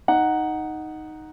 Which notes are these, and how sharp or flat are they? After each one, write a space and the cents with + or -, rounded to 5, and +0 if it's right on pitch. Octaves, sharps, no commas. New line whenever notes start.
D#4 +0 F#5 +0